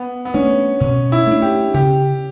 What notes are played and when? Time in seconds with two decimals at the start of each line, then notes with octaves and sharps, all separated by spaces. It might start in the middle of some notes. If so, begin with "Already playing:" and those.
Already playing: B3
0.25 B3
0.34 A3 C#4 D4
0.80 B2 C#4
1.12 E4
1.27 A3 D4
1.42 G4
1.74 C#3 G4